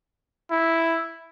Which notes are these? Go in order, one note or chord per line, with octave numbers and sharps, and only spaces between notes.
E4